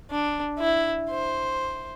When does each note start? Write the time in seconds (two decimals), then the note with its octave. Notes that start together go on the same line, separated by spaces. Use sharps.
0.10 D4
0.59 E4
1.10 C5